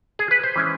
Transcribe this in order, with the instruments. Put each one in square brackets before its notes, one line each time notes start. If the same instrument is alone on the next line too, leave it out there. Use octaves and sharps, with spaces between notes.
[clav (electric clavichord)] G#4
B4
C5
E3 G#3 C#4 E4